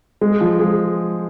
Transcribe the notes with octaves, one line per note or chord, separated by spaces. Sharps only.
G#3
F3
G#3